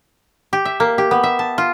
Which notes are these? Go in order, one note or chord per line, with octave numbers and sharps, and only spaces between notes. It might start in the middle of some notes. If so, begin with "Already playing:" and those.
G4
E5
A#3
G4
B3
E5
A5
F4